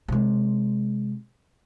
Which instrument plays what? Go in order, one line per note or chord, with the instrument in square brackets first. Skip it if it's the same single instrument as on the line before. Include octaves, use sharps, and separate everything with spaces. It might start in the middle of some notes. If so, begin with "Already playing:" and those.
[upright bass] C3 G#3